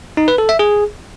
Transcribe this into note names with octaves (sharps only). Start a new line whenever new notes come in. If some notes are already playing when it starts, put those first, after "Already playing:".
D#4
B4
A4
E5
G#4